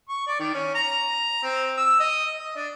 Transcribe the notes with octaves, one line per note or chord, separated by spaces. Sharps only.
C#6
D5
D#3
C#4
A#5
C4
E6
D#5
D#5
D4